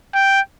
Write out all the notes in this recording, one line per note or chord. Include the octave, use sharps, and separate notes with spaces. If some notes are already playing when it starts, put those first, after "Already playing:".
G5